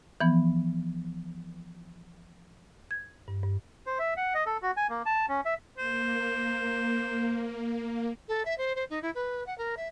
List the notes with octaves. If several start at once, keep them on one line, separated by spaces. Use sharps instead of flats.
E3 F3 B3
G#6
G2
G2
C5
E5
F#5
D#5
A4
F#4
G#5
A#3
A5
C#4
E5
A#3 C5
A4
E5
C5
C5
D#4
E4
B4
F#5
A#4
E5